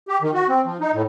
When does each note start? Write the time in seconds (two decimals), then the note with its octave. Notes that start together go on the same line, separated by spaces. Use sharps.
0.08 G4
0.22 D#3
0.34 F#4
0.49 C4
0.65 F3
0.80 D#4
0.94 A2